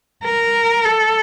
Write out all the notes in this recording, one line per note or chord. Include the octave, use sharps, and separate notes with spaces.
A#4
A4